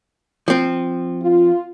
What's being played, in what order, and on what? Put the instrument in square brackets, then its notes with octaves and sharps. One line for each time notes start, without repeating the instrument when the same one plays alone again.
[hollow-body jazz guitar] F3 C4
[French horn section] F4